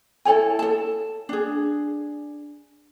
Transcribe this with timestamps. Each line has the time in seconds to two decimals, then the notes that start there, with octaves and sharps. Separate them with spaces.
0.25 E4 A4 C#5 G#5
0.59 A4 A5
1.29 D4 G#4